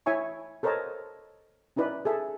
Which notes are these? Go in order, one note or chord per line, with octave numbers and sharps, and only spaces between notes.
E4 C#5 E5 G#5 C#6
A4 A#4 C5 C#5 D#5 A5
C#4 D#4 E4 B4 D5
G#4 A4 E5